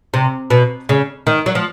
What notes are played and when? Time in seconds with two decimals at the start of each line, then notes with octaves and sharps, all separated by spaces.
0.14 C3
0.50 B2
0.89 C#3
1.27 D#3
1.46 F#3
1.55 F3